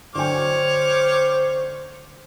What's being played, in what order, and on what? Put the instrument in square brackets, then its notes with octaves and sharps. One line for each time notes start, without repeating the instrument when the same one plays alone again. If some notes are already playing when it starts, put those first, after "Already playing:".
[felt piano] D3 F#3 G5 [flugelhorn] C5 [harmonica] C#5 D6 F6